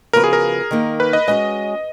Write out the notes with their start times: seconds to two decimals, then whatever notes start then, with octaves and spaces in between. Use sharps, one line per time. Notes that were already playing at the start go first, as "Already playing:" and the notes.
0.13 C#3 F3 B3 F#4 A#4 B4
0.24 G#4
0.33 A#4
0.71 D#3 A#3 D#4
1.00 B4
1.13 D#5
1.28 G#3 C#4 F#4 D#5